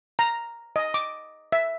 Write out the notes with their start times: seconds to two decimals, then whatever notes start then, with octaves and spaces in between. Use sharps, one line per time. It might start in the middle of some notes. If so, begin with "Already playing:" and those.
0.19 A#5
0.76 D#5
0.94 D6
1.52 E5